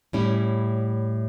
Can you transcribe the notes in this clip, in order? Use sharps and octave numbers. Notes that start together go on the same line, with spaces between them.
A2 G3 C#4 E4